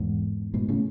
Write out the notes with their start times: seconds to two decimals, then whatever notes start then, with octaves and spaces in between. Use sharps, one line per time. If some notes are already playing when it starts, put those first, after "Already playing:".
Already playing: E2 G#2
0.54 G#2 B2
0.68 A2 C#3